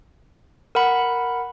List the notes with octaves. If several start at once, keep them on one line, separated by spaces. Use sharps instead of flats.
A#4 F#5 B5